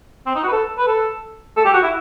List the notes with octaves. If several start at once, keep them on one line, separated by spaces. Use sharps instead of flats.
C4
D#4
F#4
B4
A4
B4
A4
A4
G4
F#4
E4